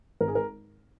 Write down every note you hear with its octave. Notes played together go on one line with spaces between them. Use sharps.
G#1 A#4
G#4
A#4